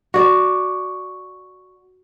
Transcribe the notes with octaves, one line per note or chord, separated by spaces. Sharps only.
F#4 D5